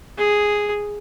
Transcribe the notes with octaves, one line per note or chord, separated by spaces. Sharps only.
G#4